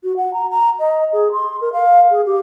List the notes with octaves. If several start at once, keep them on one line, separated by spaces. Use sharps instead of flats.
F#4
F#5
A#5
A#5
D#5
G#4
C6
A#4
F5
G#4
G4